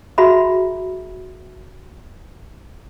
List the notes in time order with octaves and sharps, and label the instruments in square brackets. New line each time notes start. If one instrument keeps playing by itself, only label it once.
[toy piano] F#4 G#4 E5 A#5 B5